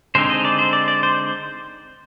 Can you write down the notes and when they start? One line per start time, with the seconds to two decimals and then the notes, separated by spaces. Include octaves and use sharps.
0.15 D3 G#3 C4 D#4 C5
0.30 D#5
0.45 D5
0.59 C5
0.73 D5
0.88 D5
1.03 C5